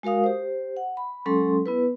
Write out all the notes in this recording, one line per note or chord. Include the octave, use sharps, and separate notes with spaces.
G#3 F#4 A#4 F5 D#6
G4 C5
F#5
B5
F#3 G#3 C#4 A4 C6
B3 E4 B4